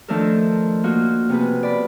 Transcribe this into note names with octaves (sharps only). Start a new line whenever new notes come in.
D#3 F3 A3 D4 A4 A#4
A#3 D#4 F4 F#4
C3 B3 G#4 B4
D5 B5